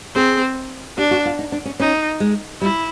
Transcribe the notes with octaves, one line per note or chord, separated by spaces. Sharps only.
C4 G#4
D4 G4
F#4
F4
D#4
D4
C#4
C#4 D#4
G#3
G3 E4